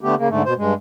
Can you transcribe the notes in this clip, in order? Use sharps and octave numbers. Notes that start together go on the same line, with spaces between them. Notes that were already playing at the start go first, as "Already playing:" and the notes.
D3 A3 B3 G4
C#3 A#3
G#2 D3 A3
B2 C5
G2 G#3